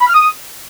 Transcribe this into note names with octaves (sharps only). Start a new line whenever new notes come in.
B5
F6
D#6